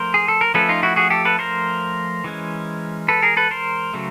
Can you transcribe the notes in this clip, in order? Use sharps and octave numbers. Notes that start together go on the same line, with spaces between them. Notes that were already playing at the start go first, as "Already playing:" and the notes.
Already playing: F3 A3 A#4 C5
G#4
A4
A#4
F3 A3 C#4 A4 B4
D#4 F4
E4 F#4
F#4 G#4
G4 A4
A4 B4
A#4 C5
E3 G#3 C#4
A4 B4
G#4 A#4
A4 B4
A#4 C5
C#3 F#3 A3